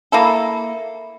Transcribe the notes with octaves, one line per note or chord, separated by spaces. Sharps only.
A#3 E4 A4